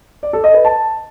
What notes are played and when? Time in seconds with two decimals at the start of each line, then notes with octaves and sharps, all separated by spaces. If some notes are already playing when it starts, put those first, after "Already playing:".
0.23 D5
0.33 A4
0.44 D#5
0.54 B4
0.65 A5